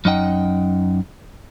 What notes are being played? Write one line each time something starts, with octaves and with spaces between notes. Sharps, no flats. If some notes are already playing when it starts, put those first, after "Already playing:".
F#2 C#4 D#4 D#5 F#5 G5